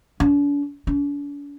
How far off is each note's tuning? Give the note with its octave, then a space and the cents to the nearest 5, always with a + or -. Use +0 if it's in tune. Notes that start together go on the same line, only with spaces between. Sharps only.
D4 -45
D4 -45